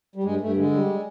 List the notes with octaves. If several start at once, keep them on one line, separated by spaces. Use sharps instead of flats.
G3
G2 G#3
G2 A3
D3 G#3
G3